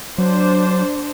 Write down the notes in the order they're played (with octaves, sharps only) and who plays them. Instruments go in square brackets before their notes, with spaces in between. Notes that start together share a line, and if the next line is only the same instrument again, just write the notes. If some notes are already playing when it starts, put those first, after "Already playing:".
[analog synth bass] F#3 [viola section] D4 C5